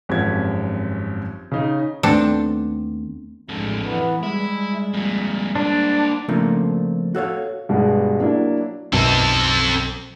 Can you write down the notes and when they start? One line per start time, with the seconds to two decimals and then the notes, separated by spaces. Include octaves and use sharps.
0.09 G#1 F#2 F3 C4 G4 G#6
1.52 C#3 D#4
2.03 D#2 A3 B3 C4 D4 A4
3.49 A1 F2 D3 G#3
3.86 E3 B3
4.23 G3 G#3 E4
4.94 F2 A#2
5.56 A#3 D4 C5
6.28 C#3 F3 A3 A#3 C4 D4
7.15 F#4 A4 C#5 F5
7.69 G2 B2 G3 G#3
8.20 F#3 A#3 D4 E4
8.93 B1 F#2 B2 C4 A4